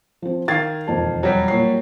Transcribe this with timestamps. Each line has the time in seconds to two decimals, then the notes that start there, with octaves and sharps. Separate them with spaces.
0.22 F3 C4
0.48 D#3 F5 G#6 A6 C7
0.88 E1 F2 A5
1.23 F#3 G3
1.48 A#2 C#5 C7